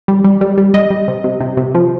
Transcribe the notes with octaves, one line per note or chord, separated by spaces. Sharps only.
G3
G3
G3
G3
G3 D#5
G3
C3
C3
C3
C3
F3